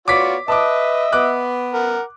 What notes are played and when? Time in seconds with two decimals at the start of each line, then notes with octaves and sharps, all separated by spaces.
0.08 B3 F4 F#4 C#5 D5 D6 B6
0.48 B4 D#5 E5 A5 D6
1.12 B3 D6 F#6
1.74 A#4 F#5